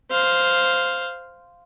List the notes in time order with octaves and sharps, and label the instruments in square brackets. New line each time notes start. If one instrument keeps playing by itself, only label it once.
[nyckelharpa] C5 F5